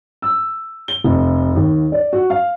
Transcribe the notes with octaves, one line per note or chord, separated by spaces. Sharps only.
E6
G7
F1
D#2
D5
F#4
F5